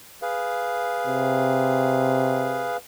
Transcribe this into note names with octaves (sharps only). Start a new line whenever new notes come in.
G#4 B4 F5
C3